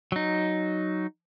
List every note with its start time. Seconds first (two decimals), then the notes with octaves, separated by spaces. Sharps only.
0.12 F#3 D#4